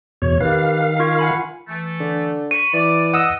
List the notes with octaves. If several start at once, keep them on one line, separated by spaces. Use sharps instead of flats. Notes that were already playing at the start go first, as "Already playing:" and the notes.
E2 B2 C#5
D#3 G4 B4 F5
F4 C#6 G#6
F#5 G#5 B5
E3 A3
D3
B5 C#6 D#7
E3 D5
D#5 F#5 D#6 E6